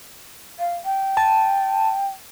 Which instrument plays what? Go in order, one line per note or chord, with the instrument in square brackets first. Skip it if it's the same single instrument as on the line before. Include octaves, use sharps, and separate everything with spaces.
[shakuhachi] F5
G5
[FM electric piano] A5